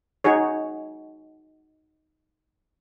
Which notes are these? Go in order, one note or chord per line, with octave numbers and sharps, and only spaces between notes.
D#4 F#4 G#4 C#5